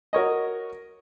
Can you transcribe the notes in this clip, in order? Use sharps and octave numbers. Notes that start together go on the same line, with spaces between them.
F#4 A#4 C#5 D#5